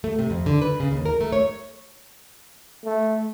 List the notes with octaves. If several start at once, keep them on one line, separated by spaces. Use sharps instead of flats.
A3
C3
F2
D3
B4
C#3
D#2
A#4
A3
C#5
A3